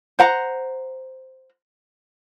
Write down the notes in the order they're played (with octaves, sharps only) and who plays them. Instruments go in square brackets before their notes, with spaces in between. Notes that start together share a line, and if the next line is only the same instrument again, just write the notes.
[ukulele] C5 F#5 A#5